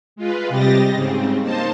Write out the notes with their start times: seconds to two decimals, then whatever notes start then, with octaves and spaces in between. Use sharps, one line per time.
0.16 G#3 F4 B4
0.49 C3 G3 G4 D#5 A6 A#6
0.94 G#2 C#3 C4
1.42 A#3 D#4 C5 A5